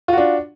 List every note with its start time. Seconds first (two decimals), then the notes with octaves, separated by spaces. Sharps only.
0.08 F4
0.13 F#4
0.18 D4